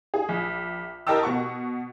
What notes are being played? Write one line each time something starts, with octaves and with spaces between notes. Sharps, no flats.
G#4
A#1
G4 A#4 D#5 G5 A5 E6
B2 F#5 C#6